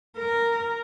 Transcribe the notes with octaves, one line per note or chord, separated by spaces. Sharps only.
A#4